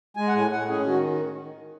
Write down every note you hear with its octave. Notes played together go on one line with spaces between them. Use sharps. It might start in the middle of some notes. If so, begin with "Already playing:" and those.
G#3 G#5
F#5
A2 G#5
A2 F#5
C#4 G#4
D#3 F#4